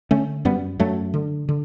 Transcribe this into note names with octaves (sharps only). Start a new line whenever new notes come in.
D3 A3 C#4
F#2 G3 B3
F#2 F#3 A3
D3
D3